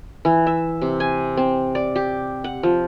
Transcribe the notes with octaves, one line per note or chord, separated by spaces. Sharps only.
E3
E5
C3
G#5
C4
D5
G4
F#5
F3